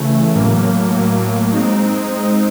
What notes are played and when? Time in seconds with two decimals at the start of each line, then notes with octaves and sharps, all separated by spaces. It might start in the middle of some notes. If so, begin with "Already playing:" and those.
Already playing: C#3 E3 A3
0.35 A2 F#3 A#3
0.94 A2 F#3 A#3
1.53 G#3 C4 D#4
2.11 G#3 C4 D#4